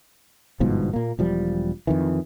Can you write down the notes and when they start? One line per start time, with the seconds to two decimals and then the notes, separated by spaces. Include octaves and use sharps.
0.60 G1 G#2 B2 F3
0.93 A#2 A#3
1.19 E1 F3 G3
1.87 F2 D#3 E3